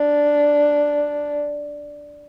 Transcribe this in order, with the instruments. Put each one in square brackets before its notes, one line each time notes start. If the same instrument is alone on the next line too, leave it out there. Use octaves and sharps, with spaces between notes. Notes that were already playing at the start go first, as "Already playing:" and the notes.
Already playing: [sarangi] D4